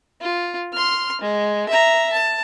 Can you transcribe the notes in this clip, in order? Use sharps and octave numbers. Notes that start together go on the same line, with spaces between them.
F4
C6 F6
G#3
E5 A#5
A5